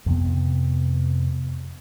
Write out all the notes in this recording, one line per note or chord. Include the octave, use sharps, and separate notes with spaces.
F2 C3 B3